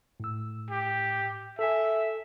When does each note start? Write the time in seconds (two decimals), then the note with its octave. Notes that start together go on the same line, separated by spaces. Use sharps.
0.20 A2 E6
0.70 G4
1.59 A4 E5 G#5